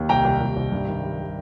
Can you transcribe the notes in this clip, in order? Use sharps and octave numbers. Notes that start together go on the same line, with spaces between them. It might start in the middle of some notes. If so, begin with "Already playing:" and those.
Already playing: D#2
C2 G5 A#5
C2
C2
C2
G2
D#3
G3
G3